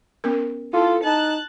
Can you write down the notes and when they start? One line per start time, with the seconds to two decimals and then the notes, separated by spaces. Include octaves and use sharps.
0.24 B3 C#4 A#4
0.74 E4 F4 A4
1.04 D#4 A5 F#6